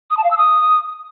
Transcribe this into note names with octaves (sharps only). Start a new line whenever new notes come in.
D#6
A5
F5
E6
D#6